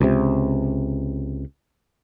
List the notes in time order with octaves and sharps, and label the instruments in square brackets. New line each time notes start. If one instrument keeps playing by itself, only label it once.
[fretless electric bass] C#2 C3